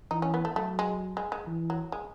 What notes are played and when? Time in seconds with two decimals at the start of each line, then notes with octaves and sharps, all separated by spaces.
0.11 E3 D#4
0.22 C#4
0.34 B3
0.45 A3
0.56 F#3 A3
0.79 G#3
1.17 G#3
1.32 G#3
1.47 E3
1.70 F#3
1.92 G#3